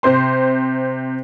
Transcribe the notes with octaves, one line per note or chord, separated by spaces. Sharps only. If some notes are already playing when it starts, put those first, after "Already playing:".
C3 C5 C6